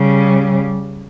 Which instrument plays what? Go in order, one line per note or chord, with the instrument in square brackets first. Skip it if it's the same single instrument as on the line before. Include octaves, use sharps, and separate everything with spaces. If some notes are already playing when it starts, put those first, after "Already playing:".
Already playing: [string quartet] C#3 G3